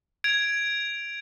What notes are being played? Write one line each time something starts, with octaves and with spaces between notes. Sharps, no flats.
G#6 D7 F7